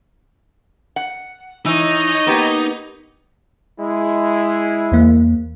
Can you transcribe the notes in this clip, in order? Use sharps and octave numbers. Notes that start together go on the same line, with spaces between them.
F#5
E3 D#4 C#5 D#5
A#3 B3 G4
G#3 E4
E2 A#3